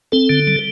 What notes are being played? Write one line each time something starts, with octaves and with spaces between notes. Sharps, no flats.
C4 A4
D3
G3